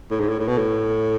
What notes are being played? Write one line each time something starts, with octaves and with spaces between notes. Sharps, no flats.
A2
G#2
A2
A2
B2
A2